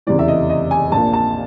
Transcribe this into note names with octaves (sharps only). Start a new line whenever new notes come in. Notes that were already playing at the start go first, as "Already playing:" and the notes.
F1 E2 C#3 E3 D5
E5
D#5
D#5
G#5
A#1 A#2 A5
A5